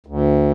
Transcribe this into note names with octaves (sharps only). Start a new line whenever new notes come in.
D2